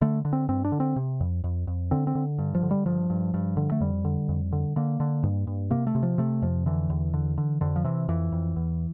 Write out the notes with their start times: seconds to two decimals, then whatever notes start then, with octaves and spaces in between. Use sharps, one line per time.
0.01 D3 A3
0.25 D3
0.33 C4
0.49 G2 C4
0.65 D4
0.72 D3
0.80 C4
0.96 C3
1.20 F2
1.44 F2
1.67 F2
1.91 D3 C4
2.07 C4
2.15 D3
2.39 G2
2.55 F3
2.63 D3
2.71 G3
2.86 G2 F3
3.10 G2
3.34 G2
3.57 D3
3.72 A3
3.81 F2 G3
4.05 D3
4.29 F2
4.52 D3
4.76 D3 A#3
5.00 D3
5.23 G2
5.47 G2
5.70 C3 A#3
5.87 A3
5.95 C3
6.03 F3
6.18 C3 A3
6.42 F2 F3
6.66 D3 E3
6.90 E2
7.14 D3
7.38 D3
7.61 F2 D3
7.76 F3
7.84 C3 E3
8.08 F2 E3
8.32 F2
8.56 E2